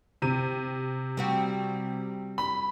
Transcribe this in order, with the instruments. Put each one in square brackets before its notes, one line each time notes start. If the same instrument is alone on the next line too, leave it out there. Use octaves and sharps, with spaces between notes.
[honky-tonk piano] C3 D#7
[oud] G3 C4 F#4
[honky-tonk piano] B5